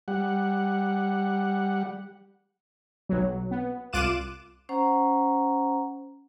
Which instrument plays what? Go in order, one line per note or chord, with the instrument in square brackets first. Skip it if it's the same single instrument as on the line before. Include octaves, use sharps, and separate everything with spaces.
[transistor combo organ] G3 F#5
[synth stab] B1 F#3
B3
C2 F4 D6 F#6 D#7 E7
[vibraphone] C#4 C5 F#5 A#5